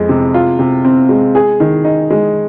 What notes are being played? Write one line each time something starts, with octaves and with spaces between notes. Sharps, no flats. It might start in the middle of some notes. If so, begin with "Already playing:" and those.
Already playing: F2 G#3
C3
F4
C3
C4
G#3
G#4
D#3
D#4
G#3